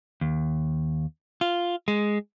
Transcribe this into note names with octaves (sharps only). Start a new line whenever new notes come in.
D#2
F4
G#3